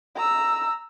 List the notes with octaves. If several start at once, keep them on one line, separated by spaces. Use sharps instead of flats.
A#5 E6